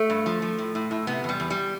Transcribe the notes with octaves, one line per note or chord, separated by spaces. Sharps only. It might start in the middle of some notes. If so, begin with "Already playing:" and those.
Already playing: A3
G2
F3
F3
A2
A2
A2
C3 B3
E2 G3
E2
G3